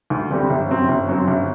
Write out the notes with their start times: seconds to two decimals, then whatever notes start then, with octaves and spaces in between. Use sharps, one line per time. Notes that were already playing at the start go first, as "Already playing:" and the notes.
0.10 D2
0.30 D3 G3 C4 G4
0.50 G1
0.69 F#2 F#3 C4
0.89 G1
1.08 F#2 F#3 C4
1.28 G1